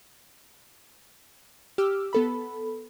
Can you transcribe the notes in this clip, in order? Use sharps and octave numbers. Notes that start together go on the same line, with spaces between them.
G4 D6 E6 F6
B3 A4 B5